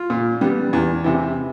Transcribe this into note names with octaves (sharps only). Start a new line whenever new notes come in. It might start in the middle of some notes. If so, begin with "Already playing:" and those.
Already playing: F4
A#2
G3 B3
E2
C3 E3